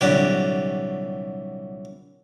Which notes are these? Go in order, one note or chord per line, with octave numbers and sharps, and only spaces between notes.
C2 A#2 D3 F#3 G4